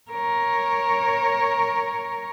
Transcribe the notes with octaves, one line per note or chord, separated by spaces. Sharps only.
A#4 C#5